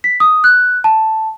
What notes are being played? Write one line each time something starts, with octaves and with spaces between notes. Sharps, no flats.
B6
D#6
F#6
A5